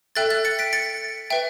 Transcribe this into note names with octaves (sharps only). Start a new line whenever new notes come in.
A4 E5 G5 F#6 A6
F#6 A6
A6 C#7
B6 D7
A6 C#7
B4 E5 G5